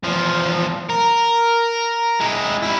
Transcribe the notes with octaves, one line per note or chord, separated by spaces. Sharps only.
E2 F3
A#4
G#3 E4
E4 G4